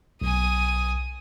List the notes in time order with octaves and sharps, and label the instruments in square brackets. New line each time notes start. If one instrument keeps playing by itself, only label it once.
[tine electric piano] B1 [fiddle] G#5 D#6